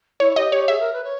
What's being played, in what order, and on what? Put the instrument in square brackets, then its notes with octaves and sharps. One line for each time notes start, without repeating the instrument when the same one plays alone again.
[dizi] E4 [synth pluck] C#5
[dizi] G4 [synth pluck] D#5
[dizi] G4 [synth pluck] C#5
[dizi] G#4 [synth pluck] E5
[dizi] A#4
B4
C#5